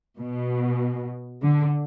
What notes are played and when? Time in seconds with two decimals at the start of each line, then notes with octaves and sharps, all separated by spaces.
0.19 B2
1.42 D3